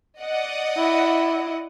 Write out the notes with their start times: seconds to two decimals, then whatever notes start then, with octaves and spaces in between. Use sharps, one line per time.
0.21 D5 D#5 F#5
0.77 E4